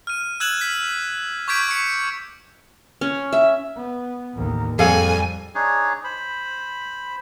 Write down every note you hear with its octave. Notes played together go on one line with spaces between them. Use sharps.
F6 D#7
E6 F#6 G#6 E7 F#7
B6
C#6 D6 G6 G#6 B6 D7
C#6 C#7
C#4
E5
B3
A1 D#2
F2 G3 G#4 A4 F5 G#5
D4 D#4 G#4 C#5
C5 B5